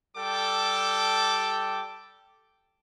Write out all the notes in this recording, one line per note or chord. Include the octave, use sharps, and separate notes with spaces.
G3 A4 G5 A5 D6